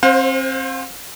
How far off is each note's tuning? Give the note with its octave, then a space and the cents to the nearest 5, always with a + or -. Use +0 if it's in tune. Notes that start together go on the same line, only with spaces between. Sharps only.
C4 +35 C5 +0 F5 +40